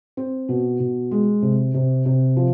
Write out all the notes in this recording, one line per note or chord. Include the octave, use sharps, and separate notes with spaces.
C4
B2
B2
G#3
C3
C3
C3
F3